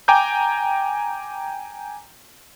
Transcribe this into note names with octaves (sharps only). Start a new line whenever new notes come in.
G5 G#5 A#5 D6 G6